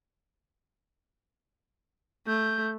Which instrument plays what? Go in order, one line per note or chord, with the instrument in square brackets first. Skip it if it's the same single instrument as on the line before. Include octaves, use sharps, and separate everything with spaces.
[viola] A3 [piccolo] G6